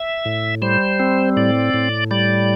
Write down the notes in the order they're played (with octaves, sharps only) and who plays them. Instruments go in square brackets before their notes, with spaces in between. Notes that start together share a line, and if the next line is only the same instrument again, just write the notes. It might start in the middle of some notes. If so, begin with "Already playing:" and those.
Already playing: [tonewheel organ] E5
A2
G3 C5
C4
A2 D5
A2
G3 D5